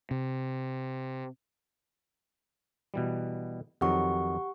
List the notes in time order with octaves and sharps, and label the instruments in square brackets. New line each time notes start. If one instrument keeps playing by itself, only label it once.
[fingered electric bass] C3
[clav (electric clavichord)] B2 E3 G3
[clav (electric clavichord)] F2 D#3 F#3 [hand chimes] G4 F#5 C#6